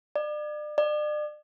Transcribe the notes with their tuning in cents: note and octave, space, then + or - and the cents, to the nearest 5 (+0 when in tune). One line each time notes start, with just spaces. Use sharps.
D5 +35
D5 +35